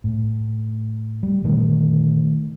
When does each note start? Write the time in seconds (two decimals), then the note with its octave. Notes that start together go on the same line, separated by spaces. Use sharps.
0.04 A2
1.23 G3
1.44 A#2 D3 D#3 A3